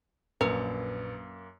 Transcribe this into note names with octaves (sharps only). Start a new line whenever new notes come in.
A#1 F#2 A#3 A#4 B4